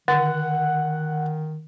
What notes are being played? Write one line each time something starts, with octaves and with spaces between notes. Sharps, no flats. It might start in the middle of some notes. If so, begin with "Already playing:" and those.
D3 D#3 F#5